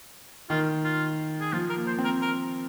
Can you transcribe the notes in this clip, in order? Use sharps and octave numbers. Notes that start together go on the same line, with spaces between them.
D#3 F4
F4
G#4
F3 F4
A#4
A#3
C5
C4
A#4
A#4